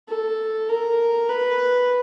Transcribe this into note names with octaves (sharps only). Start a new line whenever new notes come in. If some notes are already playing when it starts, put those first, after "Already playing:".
A4
A#4
B4